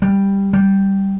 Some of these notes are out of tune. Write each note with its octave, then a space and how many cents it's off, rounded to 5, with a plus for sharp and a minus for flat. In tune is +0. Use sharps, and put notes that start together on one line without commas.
G3 +5
G3 -5